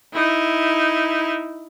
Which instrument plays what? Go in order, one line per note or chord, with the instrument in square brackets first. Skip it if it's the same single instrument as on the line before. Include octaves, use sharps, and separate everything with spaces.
[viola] D#4 E4